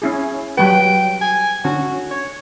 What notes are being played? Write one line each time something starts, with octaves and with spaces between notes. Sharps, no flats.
C#4 E4 G#4
F#3 G3 B4 G5
G#5
D3 C#4 F#4
C#5